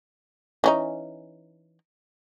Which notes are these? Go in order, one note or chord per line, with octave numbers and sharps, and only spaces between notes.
E3 C#4 D#4